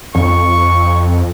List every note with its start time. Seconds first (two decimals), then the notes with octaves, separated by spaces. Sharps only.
0.15 F2 C#6